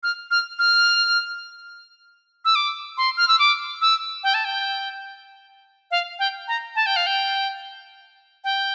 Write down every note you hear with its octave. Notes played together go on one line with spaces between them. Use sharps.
F6
F6
F6
E6
D6
C6
F6
E6
D6
E6
G5
A5
G5
F5
G5
A#5
A5
G5
F5
G5
G5